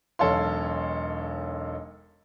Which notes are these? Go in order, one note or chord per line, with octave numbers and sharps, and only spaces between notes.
E1 B1 A4 C#5 F5 C6